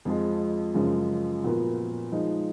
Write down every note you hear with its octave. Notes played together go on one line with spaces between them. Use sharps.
F2 F3 G#3
F#2 C#3 F3 G#3
A#2 F3 B3 F#4 A#4
F3 G#3 D#4